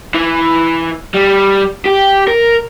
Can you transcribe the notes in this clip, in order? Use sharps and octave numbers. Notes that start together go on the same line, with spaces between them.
E3
G3
G4
A#4